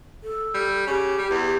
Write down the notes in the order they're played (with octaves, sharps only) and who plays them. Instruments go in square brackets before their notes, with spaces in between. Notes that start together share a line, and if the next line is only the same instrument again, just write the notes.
[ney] A4
[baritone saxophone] G3
[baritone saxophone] C#3 [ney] G4
[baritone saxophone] G3
E2